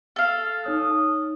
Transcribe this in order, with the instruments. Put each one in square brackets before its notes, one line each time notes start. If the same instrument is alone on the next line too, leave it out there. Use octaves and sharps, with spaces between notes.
[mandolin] A4 F5
[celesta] D#4 C#5 F6 [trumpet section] D#6